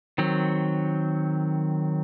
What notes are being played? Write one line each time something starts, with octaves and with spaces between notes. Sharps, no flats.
D#3 F#3 C4